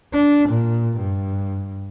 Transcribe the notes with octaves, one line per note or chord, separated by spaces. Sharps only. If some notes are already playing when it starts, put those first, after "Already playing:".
D4
A#2
G2